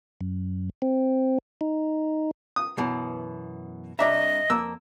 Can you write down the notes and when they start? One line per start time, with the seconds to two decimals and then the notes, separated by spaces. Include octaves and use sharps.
0.21 F#2
0.82 C4
1.61 D#4
2.56 D#6
2.77 F#2 B2 E3
3.99 C2 D4 D#5 E5 A#5
4.50 F2 A#3 E6